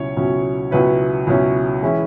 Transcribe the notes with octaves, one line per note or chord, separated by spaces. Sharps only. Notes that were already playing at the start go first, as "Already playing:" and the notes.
Already playing: C#2 B2 F#3 C#4 E4 C#5
C#2 B2 F#3 C#4 E4
C#2 B2 F#3 C#4 E4 B4
C#2 B2 F#3 C#4 E4
E3 G#3 C#4 E4